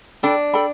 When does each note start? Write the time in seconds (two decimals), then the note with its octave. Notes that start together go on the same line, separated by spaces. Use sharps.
0.23 D4 A4 G5 B5
0.53 A4 G5 B5